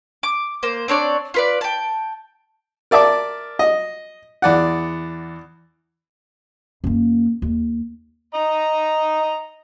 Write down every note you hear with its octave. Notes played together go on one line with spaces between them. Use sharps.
D6
A#3 C5
C4 D4 C#5 D5
F4 B4 D5
G5 A5
A#4 D5 E5 A5 D6
D#5
E2 D5 F#5
F#2 A#3
D#2
D#5 A#5